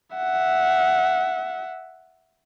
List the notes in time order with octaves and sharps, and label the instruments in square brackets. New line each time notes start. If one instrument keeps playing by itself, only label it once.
[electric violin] E5 F#5